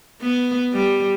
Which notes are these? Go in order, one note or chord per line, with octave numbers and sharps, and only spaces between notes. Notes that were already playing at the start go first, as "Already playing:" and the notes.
B3
G3